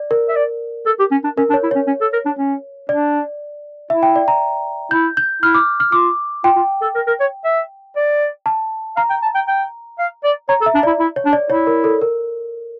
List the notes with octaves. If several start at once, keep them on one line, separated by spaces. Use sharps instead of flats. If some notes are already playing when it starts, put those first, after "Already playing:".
Already playing: D5
A#4
E5
D5
A4
G4
C#4
D4
C#4 A#4
D4
C#5
E4
C#4 C#5
C#4
A4
A#4
D4
C#4
D4 D5
E4 E5
G5
D5
A#5
E4 G6
G6
E4 F6
D6
F6
F4 D6
F4 G5
F4
A4
A#4
A#4
C#5
E5
D5
A5
F5 A#5
G5
A5
G5
G5
F5
D5
C#5 A#5
A4
E5
D4
E4 D5
E4
C#5
D4
D5
E4 C#5
A#4
A4
A#4